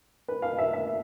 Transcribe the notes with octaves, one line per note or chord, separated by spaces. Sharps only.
B4
F5
E5
E5